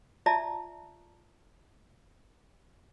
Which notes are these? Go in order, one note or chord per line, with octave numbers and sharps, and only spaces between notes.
F4 D5 E5 A5 A#5